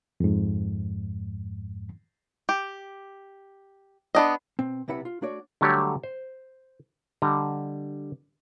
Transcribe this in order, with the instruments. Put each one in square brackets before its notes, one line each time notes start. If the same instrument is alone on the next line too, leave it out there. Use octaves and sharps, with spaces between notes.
[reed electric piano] F2 G#2
[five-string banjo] G4
B3 D4 D#5
[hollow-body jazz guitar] B2 C4
B1 C3 E4 B4 F#5
F4
A3 D4 F#4 C#5 D5
[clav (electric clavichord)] D3 F#3 G3 A3 G4 C#5
C5
D3 G3 D#5 A#5